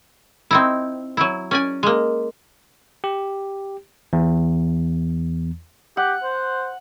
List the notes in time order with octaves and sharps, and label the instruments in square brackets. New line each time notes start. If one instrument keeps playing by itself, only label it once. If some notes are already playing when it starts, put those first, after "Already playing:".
[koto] C4 D#4 E4
F#3 E4
C#4 D5 G#5
G#3 A#3
[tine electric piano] G4
E2
[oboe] G4 [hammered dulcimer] F#5
[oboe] C5